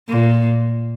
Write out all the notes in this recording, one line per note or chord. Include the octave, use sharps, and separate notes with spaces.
A#2